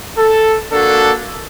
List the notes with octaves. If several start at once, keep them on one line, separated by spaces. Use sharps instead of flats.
A4
A#3 D4 F#4 A4